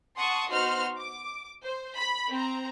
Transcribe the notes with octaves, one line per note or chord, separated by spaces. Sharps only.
F#5 A5 C6 C#6 D#6
B3 D#4 F#4 C5 C6 F6
D6
C5
B5 B6
C4 A#5